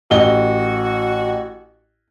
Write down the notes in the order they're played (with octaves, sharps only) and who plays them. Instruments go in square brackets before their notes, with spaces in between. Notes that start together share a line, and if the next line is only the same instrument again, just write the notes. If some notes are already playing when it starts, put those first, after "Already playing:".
[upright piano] A1 D#5 G7 [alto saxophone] F#4